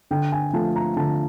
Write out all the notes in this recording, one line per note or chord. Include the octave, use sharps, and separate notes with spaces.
D3 G5
G#5
F3 A3 A5
A#5
D3 A5